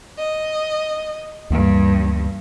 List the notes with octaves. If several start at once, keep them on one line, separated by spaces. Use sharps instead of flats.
D#5
D2 G2 E3 A#3